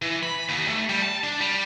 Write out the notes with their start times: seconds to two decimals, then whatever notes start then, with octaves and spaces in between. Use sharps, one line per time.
0.02 E3
0.23 B5
0.49 D#2
0.68 A3
0.89 G3
1.03 A5
1.24 D4
1.41 G3